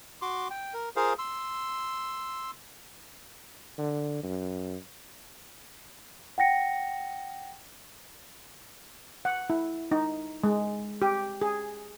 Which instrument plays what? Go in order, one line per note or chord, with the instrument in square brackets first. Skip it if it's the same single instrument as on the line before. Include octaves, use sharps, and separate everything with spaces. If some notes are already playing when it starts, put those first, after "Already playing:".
[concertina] F#4 C6 D6
G5
A#4
F4 G#4 A#4 C5 F5
C6 E6
[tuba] D3
F#2
[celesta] F#5 G5 A#6 C#7
[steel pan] F#5
E4
D#4
G#3
G4
G#4